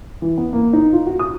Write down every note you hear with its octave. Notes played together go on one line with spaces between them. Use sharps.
E3
B3
A#3
D#4
F4
F#4
D#6